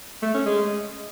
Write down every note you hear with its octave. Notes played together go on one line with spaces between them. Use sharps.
A3
C#4
G#3